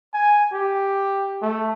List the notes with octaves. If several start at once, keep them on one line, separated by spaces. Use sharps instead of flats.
G#5
G4
A3